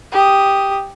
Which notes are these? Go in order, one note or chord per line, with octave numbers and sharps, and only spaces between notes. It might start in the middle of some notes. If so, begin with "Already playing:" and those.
G4 D#6